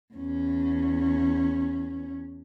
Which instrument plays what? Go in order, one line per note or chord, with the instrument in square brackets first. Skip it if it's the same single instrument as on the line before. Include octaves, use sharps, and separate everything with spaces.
[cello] E2 C#4